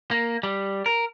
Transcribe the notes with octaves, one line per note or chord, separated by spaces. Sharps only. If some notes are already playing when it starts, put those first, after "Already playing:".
A#3
G3
A#4